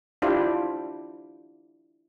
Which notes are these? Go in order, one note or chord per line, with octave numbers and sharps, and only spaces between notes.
D4 E4 F4 G4 C5